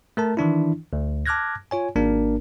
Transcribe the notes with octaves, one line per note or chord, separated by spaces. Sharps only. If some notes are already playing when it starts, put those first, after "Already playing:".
A3 A#4 A5
D#3 E3 D4 E4
D2
A5 D6 F6 F#6 G#6 A#6
F4 C#5 G#5
G#1 A#3 D4 A#4